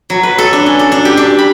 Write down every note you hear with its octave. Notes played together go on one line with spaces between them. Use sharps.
F#3
B4
A4
D4
C#4
A4
D4
G4
D4
B5